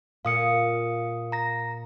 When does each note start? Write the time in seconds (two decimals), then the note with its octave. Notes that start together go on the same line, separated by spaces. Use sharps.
0.25 A#2 F5 D#6 C#7
1.32 A#5 A#6